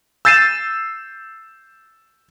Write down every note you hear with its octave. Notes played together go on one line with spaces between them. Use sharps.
E6 G6 A6 C7 D#7 E7